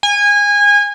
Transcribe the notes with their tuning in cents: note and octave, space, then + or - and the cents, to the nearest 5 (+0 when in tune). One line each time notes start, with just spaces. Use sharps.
G#5 -25